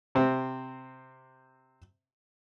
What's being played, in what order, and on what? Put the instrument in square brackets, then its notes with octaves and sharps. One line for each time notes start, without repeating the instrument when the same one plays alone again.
[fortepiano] C3 C4